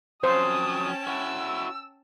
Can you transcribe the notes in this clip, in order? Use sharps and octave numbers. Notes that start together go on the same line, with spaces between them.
F2 F#3 C#4 C5 G5 A5 D#6
E4 F#4 E6